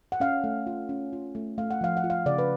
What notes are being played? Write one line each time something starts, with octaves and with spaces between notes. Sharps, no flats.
F#5
C#4 F5
A3
F4
C#4
F4
A3
A3 F5
F#5
F3 F5
F#5
F4
F5
C#3 D5
B4